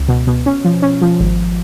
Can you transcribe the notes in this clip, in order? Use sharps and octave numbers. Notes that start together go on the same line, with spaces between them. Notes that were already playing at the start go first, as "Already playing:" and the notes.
Already playing: C#2
B2
B2
C#4
F3
C#4
F3
G#1